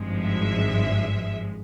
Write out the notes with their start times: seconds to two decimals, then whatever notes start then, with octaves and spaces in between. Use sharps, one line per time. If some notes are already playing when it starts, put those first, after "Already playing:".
Already playing: G#1 G2 F3 G#3
0.25 E5